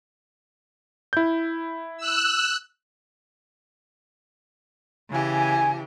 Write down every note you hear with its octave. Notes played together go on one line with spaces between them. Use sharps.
E4 G6
E6 F#6
C#3 E3 G4 G#5